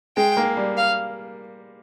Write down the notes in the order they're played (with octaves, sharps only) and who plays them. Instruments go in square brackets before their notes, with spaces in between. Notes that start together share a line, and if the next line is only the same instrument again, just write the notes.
[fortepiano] G#3 [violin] G5
[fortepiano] A#3
G3
[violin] F5